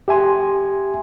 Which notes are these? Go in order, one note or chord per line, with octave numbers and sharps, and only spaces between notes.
G4 E5 G#5 C6